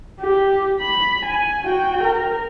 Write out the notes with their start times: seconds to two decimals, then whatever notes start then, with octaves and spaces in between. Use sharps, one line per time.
0.21 G4
0.81 B5
1.25 G#5
1.64 F#4 G5
2.04 A#4